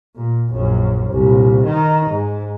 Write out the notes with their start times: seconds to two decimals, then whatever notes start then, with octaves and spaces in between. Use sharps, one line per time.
0.16 A#2
0.50 A#1 F#2
1.11 C2 A#2
1.64 D#3 D#4
2.09 G#2